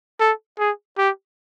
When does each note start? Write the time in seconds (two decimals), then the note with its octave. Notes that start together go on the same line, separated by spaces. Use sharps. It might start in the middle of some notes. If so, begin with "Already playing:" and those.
0.20 A4
0.59 G#4
0.98 G4